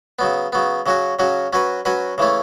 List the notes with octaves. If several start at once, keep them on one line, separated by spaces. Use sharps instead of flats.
C#3 F#3 B3
C#3 F#3 B3
C#3 F#3 C#4 F#4
C#3 F#3 C#4 F#4
F#3 C#4 F#4 B4
F#3 C#4 F#4 B4
C#3 E3 A3 C#4